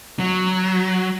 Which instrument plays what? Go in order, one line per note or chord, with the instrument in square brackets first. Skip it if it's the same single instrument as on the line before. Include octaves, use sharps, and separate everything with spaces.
[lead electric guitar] F#3